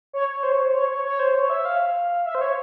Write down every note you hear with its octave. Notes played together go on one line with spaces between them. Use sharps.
C#5
C#5
C5
C#5
C5
C#5
C#5
C#5
C5
C#5
E5
F5
E5
C5
C#5